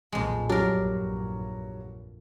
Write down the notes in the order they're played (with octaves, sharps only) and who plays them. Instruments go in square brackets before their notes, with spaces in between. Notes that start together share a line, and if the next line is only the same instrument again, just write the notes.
[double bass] B1 A#2 [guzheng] F2 G#3
[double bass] A#1 G2 [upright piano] F#3 G3 [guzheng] D4 A#4